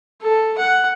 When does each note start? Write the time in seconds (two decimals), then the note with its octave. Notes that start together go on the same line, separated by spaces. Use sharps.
0.22 A4
0.58 F#5